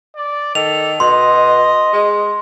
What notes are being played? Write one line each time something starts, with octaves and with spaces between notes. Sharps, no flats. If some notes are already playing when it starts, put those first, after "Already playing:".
D5
D#3 A4 F7
B2 D#5 C6
G#3